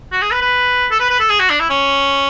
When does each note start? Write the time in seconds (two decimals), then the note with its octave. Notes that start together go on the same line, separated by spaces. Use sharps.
0.12 F#4
0.22 G#4
0.32 B4
0.42 B4
0.91 A4
1.00 B4
1.10 B4
1.20 A4
1.29 G#4
1.40 F#4
1.50 D4
1.60 E4
1.70 C#4